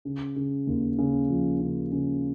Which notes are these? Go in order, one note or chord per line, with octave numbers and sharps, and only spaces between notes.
C#3
C#3
D#2
C#3
F3
C#3
C#3